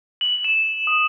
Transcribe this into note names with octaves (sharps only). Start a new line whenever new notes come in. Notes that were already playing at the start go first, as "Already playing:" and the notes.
F#7
E7
D#6